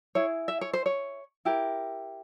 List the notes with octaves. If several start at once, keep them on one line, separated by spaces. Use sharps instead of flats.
E4 G#4 C#5
E5
C#5
C5
C#5
E4 G4 A#4